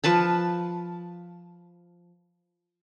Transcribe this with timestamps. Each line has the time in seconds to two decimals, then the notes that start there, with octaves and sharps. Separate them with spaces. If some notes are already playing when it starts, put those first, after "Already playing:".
0.04 F3 B4 A5 B5